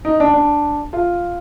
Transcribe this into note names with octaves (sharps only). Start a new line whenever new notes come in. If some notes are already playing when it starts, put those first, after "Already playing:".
D#4
D4
D4
F4